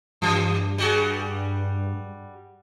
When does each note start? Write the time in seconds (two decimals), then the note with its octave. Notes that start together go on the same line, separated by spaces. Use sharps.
0.22 G2 E3 G3
0.78 G3 F#4 G#4